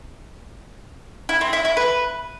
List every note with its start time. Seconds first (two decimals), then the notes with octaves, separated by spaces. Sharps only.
1.29 E4
1.41 C4
1.53 E4
1.65 E4
1.77 B4